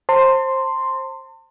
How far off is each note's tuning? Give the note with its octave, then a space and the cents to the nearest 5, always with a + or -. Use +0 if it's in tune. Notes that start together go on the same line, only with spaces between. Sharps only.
C5 +15 A5 +45 C6 +0